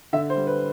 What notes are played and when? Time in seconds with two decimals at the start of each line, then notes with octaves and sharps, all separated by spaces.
0.13 D3 E5
0.30 C5
0.35 G3
0.47 B4